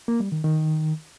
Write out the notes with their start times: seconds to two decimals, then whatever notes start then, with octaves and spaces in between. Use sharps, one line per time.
0.08 A#3
0.20 G3
0.32 D#3
0.44 D#3